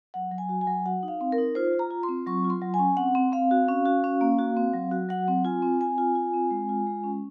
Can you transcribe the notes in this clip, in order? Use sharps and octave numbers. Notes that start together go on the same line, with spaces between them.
F#3 F#5
F#3
G#5
F#4
G#5
F#3
F#4 F#5
D#4
F5
C4
A#4
D#4
F4 C5
F4
A#5
F4
C6
C4
F#3 C#6
F4
C6
F#3
G#5
C#4
C4 F#5
C4
C4 F5
F#4
C#4
F#4
C#4
A#3
F#4
C4
F#3
F#4
F#3 F#5
C4
F4 G#5
C4
C4 G#5
F4
F4
C4
G#3
F4
G#3
C#4